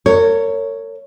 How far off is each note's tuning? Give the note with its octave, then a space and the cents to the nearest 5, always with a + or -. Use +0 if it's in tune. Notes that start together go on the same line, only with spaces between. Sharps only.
A#4 -35 C#5 +0